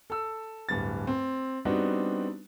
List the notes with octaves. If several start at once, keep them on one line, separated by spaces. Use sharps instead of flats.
A4 E6
D1 G2 A6
C4
G3 B3 C4 D4 D#4 F#4